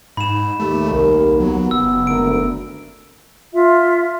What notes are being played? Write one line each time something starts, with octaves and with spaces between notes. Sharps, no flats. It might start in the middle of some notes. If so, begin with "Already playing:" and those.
G#2 B5 E7
D#2 A3 G4
C2 A#4
F#3 B3
F#1 E6
G#1 D2 A#4 D7
F4 E5